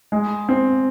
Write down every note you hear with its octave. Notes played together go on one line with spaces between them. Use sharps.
G#3
C4